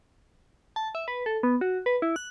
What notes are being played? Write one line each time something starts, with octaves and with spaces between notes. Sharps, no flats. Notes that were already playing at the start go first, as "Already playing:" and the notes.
A5
E5
B4
A4
B3
F#4
B4
E4
F#6